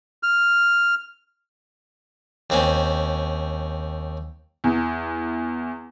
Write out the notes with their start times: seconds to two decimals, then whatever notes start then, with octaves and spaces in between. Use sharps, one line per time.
0.23 F6
2.50 D#2 C4 C#4
4.64 E2